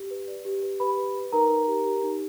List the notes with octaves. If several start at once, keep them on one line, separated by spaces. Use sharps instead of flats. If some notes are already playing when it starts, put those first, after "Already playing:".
Already playing: G4
B4
D5
G4
B4
G4 B4 B5
B4
B4
D#4 A#4 A#5
D#4
G4
G4
D#4